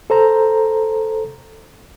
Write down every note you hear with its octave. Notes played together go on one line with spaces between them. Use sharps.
A4 C5 A#5